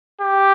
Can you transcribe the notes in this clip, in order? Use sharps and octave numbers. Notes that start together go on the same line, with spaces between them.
G4